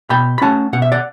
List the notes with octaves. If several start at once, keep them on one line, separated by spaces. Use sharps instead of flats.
B2 G5 B5
B5
A3 C#4 F#5 A5
B2 F#5
E5
D5 F#5